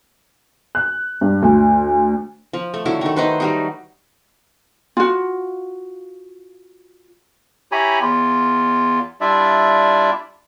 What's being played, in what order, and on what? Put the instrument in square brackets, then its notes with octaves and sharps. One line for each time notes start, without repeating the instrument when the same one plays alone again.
[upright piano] F#6
G2
D2
[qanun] F3
A3
D3 F#3 E4
D#3 A3
D#4 B4 C5
F#3 G3 D#4
[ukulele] F4 F#4
[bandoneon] E4 G4 C#5 G#5 A#5 B5
E2 F4
G3 D4 E4 F4 D5 E5